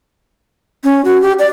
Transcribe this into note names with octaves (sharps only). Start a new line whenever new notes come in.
C#4
F#4
G4
D5